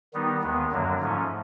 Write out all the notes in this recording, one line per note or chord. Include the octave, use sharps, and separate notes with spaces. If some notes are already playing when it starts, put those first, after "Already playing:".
D#3 G3 B3 D#4
D#2 D#3 G#3 B3
F#2 D3 F#3 A#3
G#2 F3 A3 C#4